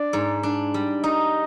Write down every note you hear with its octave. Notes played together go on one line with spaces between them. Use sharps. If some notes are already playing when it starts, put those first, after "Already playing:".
Already playing: D4 D5
G#2
D4
G3
D#4 D#5